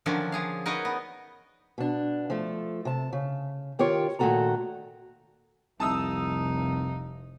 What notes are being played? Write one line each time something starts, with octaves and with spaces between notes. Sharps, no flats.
D3 D#3 F3 F#3 C#4 D4
F3 G#4 F5
D#4 F#4 A#4 B4 C#5 D#5
B3
B2 D4
F3 A3
C3 A5
C#3
D#3 F4 G4 A#4 C#5
A#2 D#3 A3 F#4 A4 A#5
F1 C2 C3 F3 D#4 A5 D#6 E6